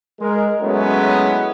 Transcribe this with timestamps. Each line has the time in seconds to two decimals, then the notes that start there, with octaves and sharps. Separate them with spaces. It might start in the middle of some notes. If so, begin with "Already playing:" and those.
0.21 G#3 A#4
0.61 F#3 G#3 A3 B3 C#4 E4